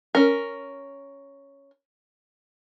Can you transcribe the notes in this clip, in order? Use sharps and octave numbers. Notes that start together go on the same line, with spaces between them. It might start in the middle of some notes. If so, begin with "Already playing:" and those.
C#4 A#4